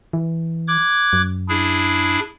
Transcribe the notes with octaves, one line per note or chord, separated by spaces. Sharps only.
E3
D6 F#6 G#6
F#2
D4 E4 G#4